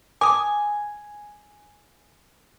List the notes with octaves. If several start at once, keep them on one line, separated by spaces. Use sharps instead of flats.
G#5 D6 D#6